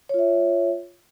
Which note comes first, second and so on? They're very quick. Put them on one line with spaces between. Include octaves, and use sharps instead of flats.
C#5 F4 E5